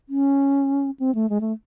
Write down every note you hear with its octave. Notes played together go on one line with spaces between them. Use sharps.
C#4
C4
A3
G#3
A3